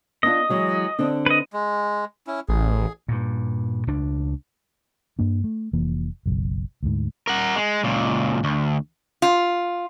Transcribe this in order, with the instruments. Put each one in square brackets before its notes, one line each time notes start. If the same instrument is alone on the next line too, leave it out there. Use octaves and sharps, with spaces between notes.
[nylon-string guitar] B3 D4 F4 [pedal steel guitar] D#5
[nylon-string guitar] E3 F#3 G#3
D3 C4 D4
[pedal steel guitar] B4 D#5
[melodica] G#3
C#4 E4
[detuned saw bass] A1 [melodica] G#4
[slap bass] G2 A#2
C#2 D4
[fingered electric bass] G2 A#3 D4
A3
F1 E3 A#3
F#1 B1
D2 G#2
[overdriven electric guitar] A#4 F#5
G#3
C#2 A#2
D2
[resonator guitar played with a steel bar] F4